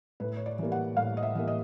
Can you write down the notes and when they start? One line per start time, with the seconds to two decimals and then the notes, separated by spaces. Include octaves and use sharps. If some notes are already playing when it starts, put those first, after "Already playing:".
0.20 A2 B4
0.37 C#5
0.46 D5
0.59 E3 G3 A#3
0.72 F#5
0.97 A2 F5
1.17 D#5
1.23 E5
1.35 E3 G3 A#3
1.48 D#5